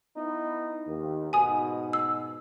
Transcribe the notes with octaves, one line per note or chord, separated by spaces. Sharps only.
B3 D#4 E4
D#2
G#2 B2 G#5 D#6
E6